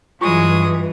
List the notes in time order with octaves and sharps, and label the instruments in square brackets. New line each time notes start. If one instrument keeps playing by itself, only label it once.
[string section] G2 E3 [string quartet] F#3 G#3 D#6 [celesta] F4 C#6